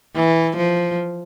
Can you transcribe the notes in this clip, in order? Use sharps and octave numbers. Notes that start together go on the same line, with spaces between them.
E3
F3